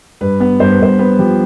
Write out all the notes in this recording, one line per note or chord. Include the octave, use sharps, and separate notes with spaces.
G2 B4
B3
G2 C5
B4
G2 C5
B3 B4
F3 G4